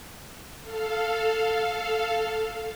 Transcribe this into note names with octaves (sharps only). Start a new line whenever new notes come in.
A4 F5